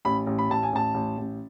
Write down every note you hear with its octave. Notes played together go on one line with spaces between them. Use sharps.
A1 B5
A1
B5
A1 A5
G#5
A1 A5
A1
A1